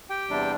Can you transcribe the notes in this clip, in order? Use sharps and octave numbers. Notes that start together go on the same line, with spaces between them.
G4 G5
E2 C3 G3 D4